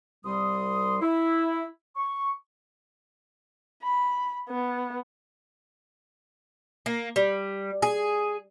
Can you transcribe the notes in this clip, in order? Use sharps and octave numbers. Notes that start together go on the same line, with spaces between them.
C2 G3 C6 D#6
E4
C#6
B5
B3
A#3
G3
G#4